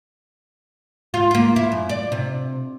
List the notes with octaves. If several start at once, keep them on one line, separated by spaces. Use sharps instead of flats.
F4
A#3 F4
E4
F#2
D5
C3